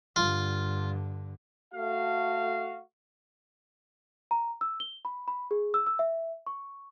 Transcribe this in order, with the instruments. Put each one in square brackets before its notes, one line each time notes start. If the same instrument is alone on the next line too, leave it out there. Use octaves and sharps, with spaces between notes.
[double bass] G2 D3 [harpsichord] F4
[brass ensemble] A3 F#4 F5
[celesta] A#5
E6
G7
B5
B5
G#4
E6
E6
E5
C#6